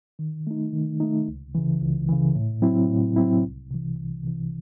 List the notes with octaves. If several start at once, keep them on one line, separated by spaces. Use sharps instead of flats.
D#3
A3 D#4
D#3
A3 D#4
C#2
C#3 E3
C#2
C#3 E3
A2
F#3 C4 E4
A2
F#3 C4 E4
C2
C3 E3
C2
C3 E3